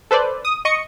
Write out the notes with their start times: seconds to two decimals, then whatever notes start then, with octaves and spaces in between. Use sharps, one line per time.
0.11 A4 B4 C5 D5
0.45 D#6
0.65 D#5 C#6 C#7